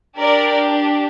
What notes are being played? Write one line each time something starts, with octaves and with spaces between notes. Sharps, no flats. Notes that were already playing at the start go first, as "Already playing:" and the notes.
D4 G4 A#4 D5